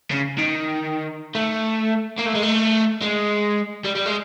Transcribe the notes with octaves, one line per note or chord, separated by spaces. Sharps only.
C#3
D#3
A3
A#3
A3
G#3
A3
G#3
G3
G3
G#3